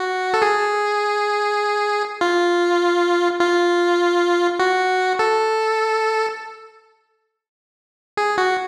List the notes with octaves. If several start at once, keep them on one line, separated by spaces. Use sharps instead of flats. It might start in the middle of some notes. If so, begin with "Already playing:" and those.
Already playing: F#4
A4
G#4
F4
F4
F#4
A4
G#4
F#4